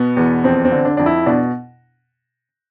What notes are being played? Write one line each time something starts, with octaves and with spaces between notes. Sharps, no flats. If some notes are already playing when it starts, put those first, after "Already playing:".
Already playing: B2 B3
E2
F2 C4
C4
D3
D4
F2 D4
E4
B2 D4